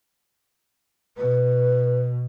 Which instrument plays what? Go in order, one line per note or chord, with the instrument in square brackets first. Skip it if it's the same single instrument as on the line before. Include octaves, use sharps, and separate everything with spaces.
[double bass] B2 [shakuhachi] B4